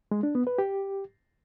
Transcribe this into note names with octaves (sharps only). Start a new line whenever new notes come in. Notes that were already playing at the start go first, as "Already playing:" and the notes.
G#3
D4
B3
B4
G4